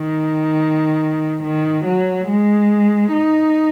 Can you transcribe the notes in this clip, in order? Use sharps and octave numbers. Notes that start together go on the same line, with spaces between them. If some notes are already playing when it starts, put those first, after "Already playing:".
Already playing: D#3
D#3
F#3
G#3
D#4